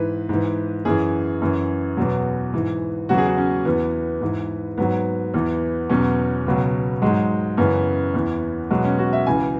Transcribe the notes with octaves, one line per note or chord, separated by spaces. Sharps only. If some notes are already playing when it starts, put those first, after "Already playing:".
Already playing: G#2 E3 B4
G#2 E3
F#2 E3 G#4
F#2 E3
E2 B2 F#3
G#2 E3
E2 C#3 F#3 F#4
G#4
F#4
C#4
E2 E3 B3
G#2 E3
G#2 F#3 B3
E2 E3
E2 B2 F#3 C#4
C#2 B2 F#3
G#2 F#3 G#3
F#2 C#3 E3 B3
E2 E3
E2 B2 F#3 G#3
C#4
F#4
E5
C#2 C#3 E3 G#5